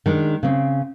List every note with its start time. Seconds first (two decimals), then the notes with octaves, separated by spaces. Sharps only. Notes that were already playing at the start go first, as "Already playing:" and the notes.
0.06 D#3 G#3 D4
0.43 C#3 C4